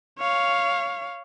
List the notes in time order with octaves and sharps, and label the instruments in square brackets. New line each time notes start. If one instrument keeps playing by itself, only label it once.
[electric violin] C#5 F5